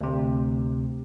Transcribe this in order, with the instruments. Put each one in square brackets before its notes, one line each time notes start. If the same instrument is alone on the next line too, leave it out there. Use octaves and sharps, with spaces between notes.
[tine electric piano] D2 C3